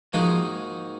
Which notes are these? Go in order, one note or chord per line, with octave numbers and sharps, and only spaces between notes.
G#2 D#3 F3 G#3 A#3 D#4 F#4